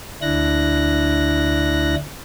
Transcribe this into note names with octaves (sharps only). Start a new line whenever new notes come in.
D2 D4 E4 F#6 A#6